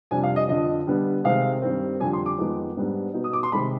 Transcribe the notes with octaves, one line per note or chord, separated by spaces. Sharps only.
F2 C3 G3 D4 G#5
F5
D#5
F2 D3 F3 D#5
D3 G3 B3 D4
C3 D#3 G#3 C4 F5
G2 D#3 G3 C4
F2 D3 G3 G#5
C6
D6
F2 D#3 G#3 B3 D#4
G#2 G3 B3 D4
B2 B3 D#4
D#6
D6
C6
C3 D#3 G#3 B5